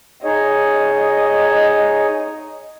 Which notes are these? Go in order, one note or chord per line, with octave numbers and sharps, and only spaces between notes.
D#4 G#4 C#5 D#5